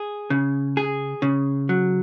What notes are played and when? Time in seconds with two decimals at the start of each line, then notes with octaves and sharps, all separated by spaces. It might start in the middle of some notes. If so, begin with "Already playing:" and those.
Already playing: G#4
0.30 C#3
0.77 G#4
1.22 C#3
1.69 F#3